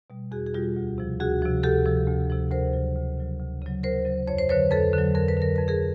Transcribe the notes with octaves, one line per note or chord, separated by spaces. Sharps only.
B2 G3
E2 F#4 G#4
G#4
B2 G3 F4 G4
D2
C3 F3
D2 F#4 G#4
C3 F3
D2 G4 A4
C3 F3
D2
C3 F3
D2 A#4 C5
C#3 F#3
D2
C#3 F#3
D2
C#3 F#3
D2 A#4 C5
C#3 F#3
F2 C#5
C5
D3 F#3 B4 C#5
F2 A4 B4
D3 F#3
F2 A#4
B4
D3 F#3 A#4
F2 B4
G#4 A#4